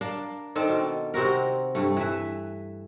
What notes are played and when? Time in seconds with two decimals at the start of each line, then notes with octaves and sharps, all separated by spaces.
0.01 A#3 D4
0.55 D#3 C4 D4 A4
0.69 B2
1.14 C3 C4 F#4 A#4
1.75 G2 A3
1.97 E3 B4 E5